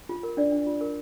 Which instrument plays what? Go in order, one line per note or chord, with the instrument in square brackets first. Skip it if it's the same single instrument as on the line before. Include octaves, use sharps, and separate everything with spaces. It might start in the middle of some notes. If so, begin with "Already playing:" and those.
[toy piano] F4
A#4
D4 D5
D4
F4
A#4